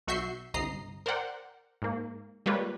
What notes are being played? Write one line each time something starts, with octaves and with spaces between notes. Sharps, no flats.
B1 F#4 E5 C#6 G6 C7
G1 C2 D#5 A#5 C7
A#4 C5 D5 F#5 G5
G#2 A#3
G3 G#3 A#3 F4 B4 C#5